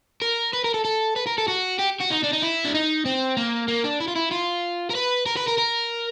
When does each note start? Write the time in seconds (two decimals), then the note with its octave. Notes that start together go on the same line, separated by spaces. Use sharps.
0.22 A#4
0.53 B4
0.64 A#4
0.74 A4
0.85 A4
1.16 B4
1.27 A#4
1.38 A4
1.48 F#4
1.79 G4
2.01 F#4
2.11 D#4
2.24 D4
2.33 D#4
2.43 E4
2.65 D4
2.75 D#4
3.06 C4
3.37 A#3
3.68 A#3
3.84 D4
4.00 E4
4.08 F4
4.16 E4
4.32 F4
4.91 A#4
4.95 B4
5.26 A#4
5.37 B4
5.48 A#4
5.58 A#4